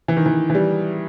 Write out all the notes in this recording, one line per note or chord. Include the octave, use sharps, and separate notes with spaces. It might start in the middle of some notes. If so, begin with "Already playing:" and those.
E3
D#3
E3
E3
G3